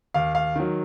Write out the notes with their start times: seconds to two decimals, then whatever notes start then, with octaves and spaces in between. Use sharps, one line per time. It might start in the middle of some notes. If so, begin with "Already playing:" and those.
0.14 D#2 F5
0.35 F5
0.56 D#3 F#3